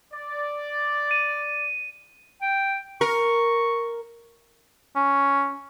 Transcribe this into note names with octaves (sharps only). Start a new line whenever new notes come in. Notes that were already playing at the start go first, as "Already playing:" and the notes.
D5
D#7
G5
A#4 C#6
C#4